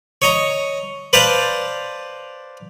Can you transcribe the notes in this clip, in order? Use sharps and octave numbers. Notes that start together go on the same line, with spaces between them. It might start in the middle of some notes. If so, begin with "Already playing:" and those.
C#5 D#5 A#5
B4 C5 D5 F5 A5 A#5